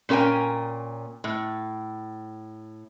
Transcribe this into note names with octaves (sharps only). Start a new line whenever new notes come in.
A#2 C#4 A#4 G5 G#5
A2